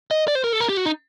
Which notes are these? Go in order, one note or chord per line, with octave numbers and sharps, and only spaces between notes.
D#5
D5
C5
A#4
A4
A#4
G4
F#4
D#4